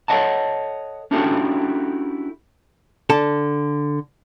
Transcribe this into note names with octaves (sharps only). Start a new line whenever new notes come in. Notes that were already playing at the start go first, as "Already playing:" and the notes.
A4 A#4 C#5 D#5 F#5 A5
C#4 D4 E4 F#4 G4 A4
D3 A4 A5